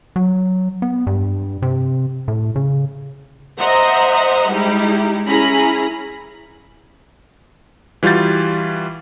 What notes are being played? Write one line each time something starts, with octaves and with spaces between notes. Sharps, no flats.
F#3
B3
G2
C3
A2
C#3
C5 D#5 E5 F#5 A#5
G3 G#3 D#4 E4 G4
C#4 E4 G#4 A#5 B5
E3 G3 F4 F#4 G6 A6